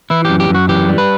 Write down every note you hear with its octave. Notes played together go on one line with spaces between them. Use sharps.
E3 E4
F#2 G4
G4
F#2
F#4
E3 G4
G3
B4